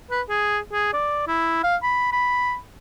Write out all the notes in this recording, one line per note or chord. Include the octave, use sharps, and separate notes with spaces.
B4
G#4
G#4
D5
E4
F5
B5
B5